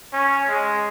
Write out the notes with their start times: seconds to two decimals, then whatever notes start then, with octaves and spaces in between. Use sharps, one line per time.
0.13 C#4
0.48 G#3